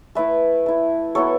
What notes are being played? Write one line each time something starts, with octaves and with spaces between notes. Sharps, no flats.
A3 E4 B4 E5
A3 E4
F#3 B3 E4 A4 C#5